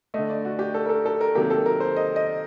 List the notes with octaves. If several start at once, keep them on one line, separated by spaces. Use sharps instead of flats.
D3 A3 D#5
D5
F#4
G4
A4
A#4
A4
A4
A#4
C3 D#3 F#3 A#3 G4
A4
A#4
C5
D#5
D#5